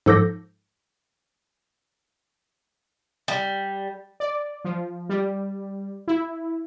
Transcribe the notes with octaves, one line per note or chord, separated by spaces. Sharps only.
G#2 F3 A4 D6 G6 A#6
G3
D5
F3
G3
E4